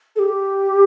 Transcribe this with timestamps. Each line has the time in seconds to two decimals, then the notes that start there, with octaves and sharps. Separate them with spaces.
0.16 A4
0.19 G4